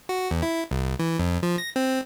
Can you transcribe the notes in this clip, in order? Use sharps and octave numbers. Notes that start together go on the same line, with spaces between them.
F#4
E2
E4
C2
E3
F2
F3
A#6
C4